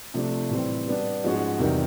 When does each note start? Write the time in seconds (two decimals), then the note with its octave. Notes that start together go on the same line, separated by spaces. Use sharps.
0.14 C3 F3 A3 D4
0.50 A2 E3 G3 C4
0.87 G3 B3 D4
1.23 G#2 F3 G#3 C#4 F#4
1.59 E2 C3 D#3 G3